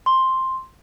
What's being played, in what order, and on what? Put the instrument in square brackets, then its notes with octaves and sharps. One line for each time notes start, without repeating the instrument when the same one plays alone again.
[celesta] C6